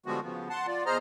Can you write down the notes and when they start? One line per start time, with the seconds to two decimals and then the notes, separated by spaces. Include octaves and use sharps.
0.06 D3 F3 G3 G#3 B3 F#4
0.23 C#3 F3 B3
0.50 F#5 A5 C6
0.67 F4 D5
0.86 E2 G#4 C5 D#5 A#5 F6